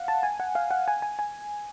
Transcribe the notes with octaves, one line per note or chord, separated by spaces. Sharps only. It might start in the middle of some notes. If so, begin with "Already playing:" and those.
Already playing: F5 F#5
A5
G#5
F#5
F5
F#5
G#5
G#5
G#5